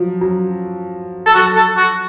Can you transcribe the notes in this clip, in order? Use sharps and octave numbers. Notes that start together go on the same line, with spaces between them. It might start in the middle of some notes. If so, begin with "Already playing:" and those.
Already playing: F3 F#3
F#3
A4
F#3 F#4
A4
F#4